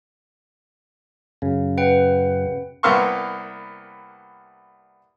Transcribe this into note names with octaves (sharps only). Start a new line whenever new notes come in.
F#2 C#3
B4 F#5 G5
C2 A#3 B3 F5 C6 C#6